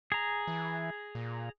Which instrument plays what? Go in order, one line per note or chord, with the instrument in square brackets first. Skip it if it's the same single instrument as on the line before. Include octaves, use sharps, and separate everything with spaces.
[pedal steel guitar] G#4 A#5
[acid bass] E3
A#2